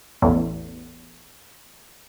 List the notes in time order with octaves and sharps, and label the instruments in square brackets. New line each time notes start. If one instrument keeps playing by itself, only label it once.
[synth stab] A1 E2